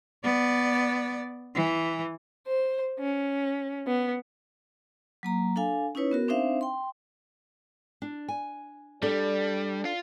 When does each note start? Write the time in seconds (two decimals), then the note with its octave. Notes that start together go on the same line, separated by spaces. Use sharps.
0.24 B3 D5
1.55 E3
2.47 C5
3.00 C#4
3.87 B3
5.23 F#3 A#3 A#5
5.56 D4 A4 F5 G#5
5.95 C#4 D#4 E4 B4 C#5
6.11 B3 F#4 A#4
6.28 C4 D4 D#4 C5 E5 F5
6.61 G5 C6
8.02 D4
8.28 G#5
9.03 G3 D4 A4 D5
9.85 F4